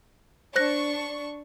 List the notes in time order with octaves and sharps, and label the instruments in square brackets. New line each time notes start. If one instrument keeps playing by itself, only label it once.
[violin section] D4 C#6 [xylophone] C5 F#6 A#6